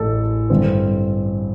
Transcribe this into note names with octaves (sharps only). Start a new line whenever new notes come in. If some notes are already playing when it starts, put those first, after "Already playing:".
Already playing: A1 A2 A4
G2 D3 C4